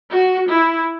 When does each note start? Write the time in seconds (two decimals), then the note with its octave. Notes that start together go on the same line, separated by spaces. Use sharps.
0.10 F#4
0.49 E4